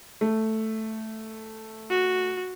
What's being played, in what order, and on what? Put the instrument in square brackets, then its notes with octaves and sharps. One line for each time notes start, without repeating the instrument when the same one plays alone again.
[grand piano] A3
[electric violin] F#4